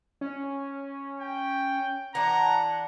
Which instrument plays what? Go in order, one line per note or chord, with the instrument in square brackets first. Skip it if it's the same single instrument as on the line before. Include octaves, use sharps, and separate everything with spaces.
[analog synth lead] C#4
[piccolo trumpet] G5
[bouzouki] E3 D4 [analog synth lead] F#5 [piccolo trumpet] A#5